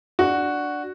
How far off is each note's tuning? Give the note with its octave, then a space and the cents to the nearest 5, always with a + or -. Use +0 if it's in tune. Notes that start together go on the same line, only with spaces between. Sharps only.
D4 +0 F#4 +0